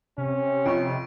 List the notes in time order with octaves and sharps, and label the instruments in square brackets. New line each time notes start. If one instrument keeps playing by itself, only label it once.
[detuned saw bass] C3 [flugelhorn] C#4
[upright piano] F2 [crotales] C#6 D7